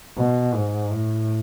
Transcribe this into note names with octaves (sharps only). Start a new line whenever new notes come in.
B2
G#2
A2